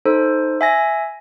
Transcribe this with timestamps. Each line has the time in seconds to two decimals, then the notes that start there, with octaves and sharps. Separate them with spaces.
0.05 D#4 A4 C5
0.61 E5 G#5 A#6